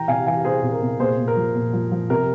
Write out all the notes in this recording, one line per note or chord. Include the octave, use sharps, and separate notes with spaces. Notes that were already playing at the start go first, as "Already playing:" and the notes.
Already playing: E3 G5 A#5
C3 F5 G#5
E3 F5 G#5
C3 G#4 C5
C3
A#4
C3
A#2 G#4 C5
A#2
A#4
F3
A#2
F3
F3
C3 A#4